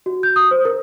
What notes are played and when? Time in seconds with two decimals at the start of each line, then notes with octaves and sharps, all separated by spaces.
0.06 F#4
0.23 G6
0.36 D#6
0.51 C5
0.65 A#4